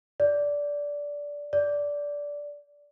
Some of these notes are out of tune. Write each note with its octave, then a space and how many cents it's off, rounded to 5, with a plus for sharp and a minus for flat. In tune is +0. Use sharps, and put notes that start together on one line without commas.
D5 -15
D5 -15